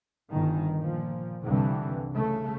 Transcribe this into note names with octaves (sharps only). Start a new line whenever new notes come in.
G1 D#3
A#2 F3
C2 G2 D3 E3
C#3 A3